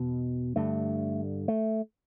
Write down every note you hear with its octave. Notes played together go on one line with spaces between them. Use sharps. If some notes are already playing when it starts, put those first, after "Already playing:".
Already playing: E2 B2
G2 D3 A3
A3